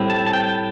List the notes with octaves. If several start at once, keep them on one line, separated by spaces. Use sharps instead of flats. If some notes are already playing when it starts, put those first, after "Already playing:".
Already playing: A2 G3 C4 E4
A5
A5
G5